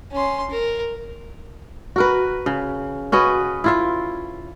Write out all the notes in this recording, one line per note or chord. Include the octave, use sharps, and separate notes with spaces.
C#4 C6
A#4
F#4 A#4 B4
C#3
C#4 F#4 B4 D#5
E4 F4 E5